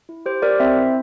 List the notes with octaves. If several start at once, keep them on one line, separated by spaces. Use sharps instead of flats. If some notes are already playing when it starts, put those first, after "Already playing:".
E4
G4 C5
G4 A#4 D5
C4 C5 E5
E4